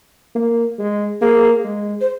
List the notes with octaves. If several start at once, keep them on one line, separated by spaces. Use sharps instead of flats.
A#3
G#3
A#3 G#4
G#3
C5